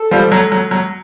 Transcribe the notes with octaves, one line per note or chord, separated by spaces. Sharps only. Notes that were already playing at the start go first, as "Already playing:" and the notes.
Already playing: A4
F3 G3
F#3
F#3
F#3